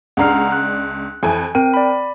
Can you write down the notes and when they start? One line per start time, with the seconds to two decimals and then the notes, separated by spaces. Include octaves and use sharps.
0.17 C#2 D4 F#5 A#5 F6 C7
0.52 F#6
1.23 F2 E3 G#5
1.55 C4 A#4 G5 D#7
1.74 D5 B5